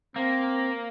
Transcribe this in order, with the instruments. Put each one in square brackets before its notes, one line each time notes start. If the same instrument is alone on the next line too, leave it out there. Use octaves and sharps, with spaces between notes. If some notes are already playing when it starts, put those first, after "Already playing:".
[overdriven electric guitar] A#3 [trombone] C4